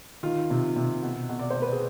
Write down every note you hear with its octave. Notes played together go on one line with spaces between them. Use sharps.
D#3 F4
C3
C3
B2
B2
D5
C5
B2
B4
G#4